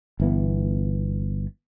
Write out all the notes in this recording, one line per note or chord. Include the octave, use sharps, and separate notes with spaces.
G1 E3 B3